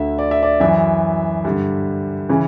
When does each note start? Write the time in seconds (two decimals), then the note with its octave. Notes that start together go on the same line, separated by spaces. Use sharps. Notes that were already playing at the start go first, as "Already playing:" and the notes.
Already playing: D2 D3 E5
0.19 D5
0.31 E5
0.43 D5
0.60 F#2 E3 E5
1.45 G2 D3
2.29 C#3 E3